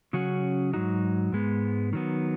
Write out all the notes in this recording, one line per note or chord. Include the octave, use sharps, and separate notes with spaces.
C#3 F#3 C#4 F#4
G#2 F#3 D#4 F#4
G#2 G#3 B3
D#3 F#3 B3